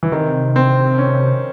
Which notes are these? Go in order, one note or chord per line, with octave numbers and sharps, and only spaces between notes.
E3
C3 D#3
C4
C#4